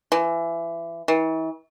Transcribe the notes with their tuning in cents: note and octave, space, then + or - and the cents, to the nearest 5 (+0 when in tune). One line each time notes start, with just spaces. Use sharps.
E3 +25
E3 -40